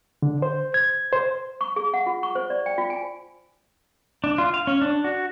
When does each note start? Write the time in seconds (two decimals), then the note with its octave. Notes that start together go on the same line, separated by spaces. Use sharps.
0.22 D3
0.42 C5
0.74 G#6
1.13 C5
1.61 C#6
1.76 G#4
1.94 F#5
2.06 F4
2.23 C#6
2.35 C5
2.50 D5
2.66 G5
2.78 F4
2.90 G#5
4.24 D4
4.38 F4
4.54 F5
4.67 C#4
4.82 D4
5.04 F#4